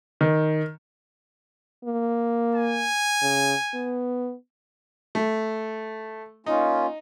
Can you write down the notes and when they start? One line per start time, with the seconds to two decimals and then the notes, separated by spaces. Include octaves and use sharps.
0.21 D#3
1.84 A#3
2.55 G#5
3.22 C#3
3.74 B3
5.15 A3
6.46 A#3 C#4 D#4 F4